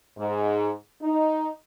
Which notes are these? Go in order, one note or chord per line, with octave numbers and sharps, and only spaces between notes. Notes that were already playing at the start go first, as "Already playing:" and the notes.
G#2
D#4